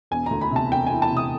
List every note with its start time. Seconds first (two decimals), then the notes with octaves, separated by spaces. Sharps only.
0.11 E1 G#5
0.26 D2 A#5
0.41 B5
0.51 C3 A5
0.71 E1 G5
0.87 G#5
0.92 E3
1.02 A5
1.12 C3
1.17 D#6